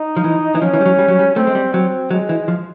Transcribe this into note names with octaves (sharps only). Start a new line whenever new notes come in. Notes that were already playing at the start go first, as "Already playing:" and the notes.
Already playing: D#4
F3
E3
E3
F3 C#4
E3
G3
F#3
G3
F#3
G3
A3 C4
G#3
G3
F#3 C4
F#3 G#3
E3
F3